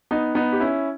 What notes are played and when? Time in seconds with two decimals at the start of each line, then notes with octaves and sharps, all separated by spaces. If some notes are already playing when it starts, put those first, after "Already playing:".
0.11 B3 D#4
0.35 B3 D#4
0.53 G4
0.60 C#4 E4